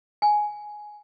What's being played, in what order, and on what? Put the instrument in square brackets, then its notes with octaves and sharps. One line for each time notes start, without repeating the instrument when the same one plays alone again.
[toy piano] G#5